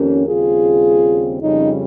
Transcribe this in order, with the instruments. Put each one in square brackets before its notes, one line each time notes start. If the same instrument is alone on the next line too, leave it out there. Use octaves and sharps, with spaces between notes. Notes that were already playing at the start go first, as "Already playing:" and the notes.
Already playing: [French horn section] F2 D#3 A#3 C#4 G4 A#4
D#2 C#3 G3 C4 F4 G#4
F2 C#3 G3 C#4 D#4